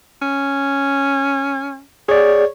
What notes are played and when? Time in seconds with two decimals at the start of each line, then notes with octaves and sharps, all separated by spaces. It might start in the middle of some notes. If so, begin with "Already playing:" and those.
0.22 C#4
2.09 G#4 C#5 D5